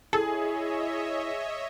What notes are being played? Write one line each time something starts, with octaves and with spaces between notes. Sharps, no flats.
E4 G#4 A4 C#5 D#5 E5